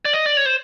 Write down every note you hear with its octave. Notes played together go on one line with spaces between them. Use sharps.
D5
D#5
D5
C#5
C5